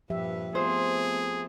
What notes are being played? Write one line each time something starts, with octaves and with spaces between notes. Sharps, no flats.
G2 A#2 F3 G4 B4 E5
A3 B3 C4 F4 G#4 C5